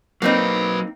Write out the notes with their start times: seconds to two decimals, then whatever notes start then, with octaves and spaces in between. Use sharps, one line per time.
0.22 F#3 A#3 C4 D#4 B4